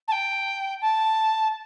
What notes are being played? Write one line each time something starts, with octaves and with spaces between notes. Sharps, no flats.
A5
G5
A5